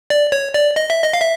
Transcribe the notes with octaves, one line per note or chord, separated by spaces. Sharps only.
D5
C#5
D5
D#5
E5
D#5
F5
E5